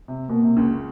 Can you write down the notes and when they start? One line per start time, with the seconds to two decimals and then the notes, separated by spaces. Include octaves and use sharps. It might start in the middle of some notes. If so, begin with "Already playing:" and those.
0.08 C3
0.29 B2 A#3
0.43 C3
0.57 C#2 C#3